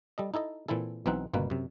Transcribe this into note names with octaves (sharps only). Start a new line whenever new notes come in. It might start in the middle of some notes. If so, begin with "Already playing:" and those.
G3 A4 D#5
D#4 E4 A4 D#5
A#2 E3 C4 E4 A4
B1 B2 E3 C4 D#4 F#5
G1 C#2 B2 A#3 B4
F#2 C3